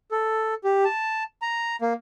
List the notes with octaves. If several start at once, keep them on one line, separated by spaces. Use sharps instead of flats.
A4
G4
A5
A#5
A#3